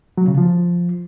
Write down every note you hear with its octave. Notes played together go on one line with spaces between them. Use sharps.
F#3
C#3
F3